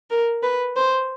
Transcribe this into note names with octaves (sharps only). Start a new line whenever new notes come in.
A#4
B4
C5